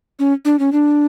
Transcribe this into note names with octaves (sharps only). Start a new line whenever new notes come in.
C#4
D4
C#4
D4